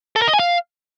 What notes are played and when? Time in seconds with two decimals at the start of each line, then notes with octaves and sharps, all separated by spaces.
0.16 A4
0.22 A#4
0.28 D#5
0.33 G#5
0.39 F5